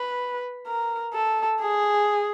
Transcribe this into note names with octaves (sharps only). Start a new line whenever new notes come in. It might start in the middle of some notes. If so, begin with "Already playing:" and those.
Already playing: B4
A#4
A4
G#4